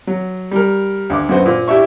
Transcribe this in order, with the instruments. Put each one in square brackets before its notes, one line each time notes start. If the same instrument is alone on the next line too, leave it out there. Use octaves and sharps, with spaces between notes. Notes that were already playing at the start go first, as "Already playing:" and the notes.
[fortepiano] F#3
G3 A#4
D2 D6
F#2 B3 F#4 C5
A#2 C5
E4 G4 D5 E5 C#6